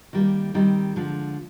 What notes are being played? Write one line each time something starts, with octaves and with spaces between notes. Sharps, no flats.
D#3 G3 A#3
D#3 G3 C4 D#4
D3 F3 G#3